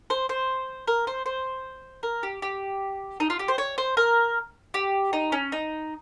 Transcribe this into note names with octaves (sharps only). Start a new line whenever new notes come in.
C5
C5
A#4
C5
C5
A#4
G4
G4
D#4
F4
G4
C5
C#5
C5
A#4
G4
D#4
C#4
D#4